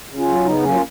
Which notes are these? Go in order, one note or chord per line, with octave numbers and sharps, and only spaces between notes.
C#3
C#4 F4
F#3
C#3 B3 D#4
F#3 A#3 C#4
F4